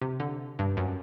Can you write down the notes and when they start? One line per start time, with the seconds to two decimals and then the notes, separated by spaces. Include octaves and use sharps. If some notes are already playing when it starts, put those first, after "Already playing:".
0.01 C3
0.20 D3
0.59 G2
0.77 F#2